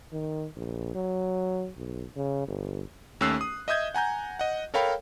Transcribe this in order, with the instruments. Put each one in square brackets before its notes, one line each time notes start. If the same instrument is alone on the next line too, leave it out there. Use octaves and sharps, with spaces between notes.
[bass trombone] D#3
A#1
F#3
B1
C#3
G1
[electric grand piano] D#2 A3 C#4 E6 F#6 C7
D#6
D#5 E5 D#6 G6 G#6
F#5 G#5 A#5 G6
D#5 F#5
A4 A#4 C#5 F5 G5 B5